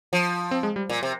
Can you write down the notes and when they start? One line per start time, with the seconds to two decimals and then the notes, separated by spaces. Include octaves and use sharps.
0.13 F3
0.51 C4
0.63 G#3
0.76 G3
0.90 A#2
1.03 C3